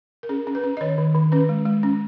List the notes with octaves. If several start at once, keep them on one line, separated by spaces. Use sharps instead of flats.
A#4
C#4 G#4
C#4
B4
C#4
D#5
D#3 C#5
D#3
D#3
C#4 B4
G#3
G#3
C#4